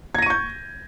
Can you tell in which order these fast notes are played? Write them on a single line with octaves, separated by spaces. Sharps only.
G#6 A#6 D#7 C#6 G6